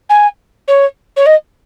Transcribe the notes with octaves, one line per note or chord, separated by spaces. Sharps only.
G#5
C#5
C#5
D#5